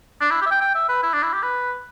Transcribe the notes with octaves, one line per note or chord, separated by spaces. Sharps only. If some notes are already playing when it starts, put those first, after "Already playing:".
D4
E4
G4
E5
G5
G5
E5
B4
E4
D4
E4
G4
B4